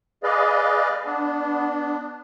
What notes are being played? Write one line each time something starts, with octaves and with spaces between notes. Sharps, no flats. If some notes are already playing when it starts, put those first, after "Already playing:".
G#4 B4 D5 D#5 F5
B3 D4